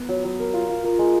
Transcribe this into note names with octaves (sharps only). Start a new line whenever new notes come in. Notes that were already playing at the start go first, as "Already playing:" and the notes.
Already playing: B3
F#3
F#3
A#4
F4
F4
A#4
G#3